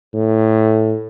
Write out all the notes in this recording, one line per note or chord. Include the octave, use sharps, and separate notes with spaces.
A2